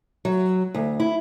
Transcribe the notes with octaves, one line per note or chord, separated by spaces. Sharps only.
F#3
D2
E4